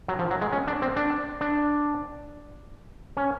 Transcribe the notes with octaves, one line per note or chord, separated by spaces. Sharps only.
F#3
F3
F#3
G#3
C#4
D4
C4
D4
D4
C#4